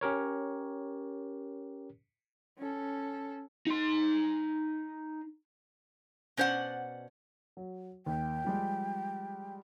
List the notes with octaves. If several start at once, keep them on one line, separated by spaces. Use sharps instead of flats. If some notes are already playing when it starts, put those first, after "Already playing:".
C#4 G4 A#4 C#5
C#4 A4
D#4 C6
B2 C#4 C5 D5 F#5
F#3
D#2 G5
F3 G3 G#3